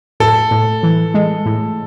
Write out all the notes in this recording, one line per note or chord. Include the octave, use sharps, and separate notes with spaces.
A2 A4
A2
E3
G#3
A2